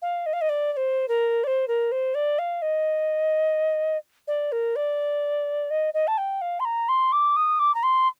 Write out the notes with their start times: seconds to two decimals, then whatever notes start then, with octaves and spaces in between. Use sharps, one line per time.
0.02 F5
0.26 D#5
0.33 F5
0.41 D#5
0.49 D5
0.72 D5
0.76 C5
1.08 A#4
1.43 D5
1.47 C5
1.67 A#4
1.91 C5
2.14 D5
2.38 F5
2.62 D#5
4.27 D5
4.52 A#4
4.75 D5
5.70 D#5
5.94 D#5
6.07 A5
6.17 G5
6.41 F5
6.59 C6
6.65 A#5
6.88 C6
7.12 D6
7.36 D#6
7.59 D6
7.74 A#5
7.83 C6